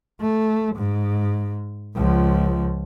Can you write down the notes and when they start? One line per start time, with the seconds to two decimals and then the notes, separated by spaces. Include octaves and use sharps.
0.20 A3
0.75 G#2
1.96 C#2 F3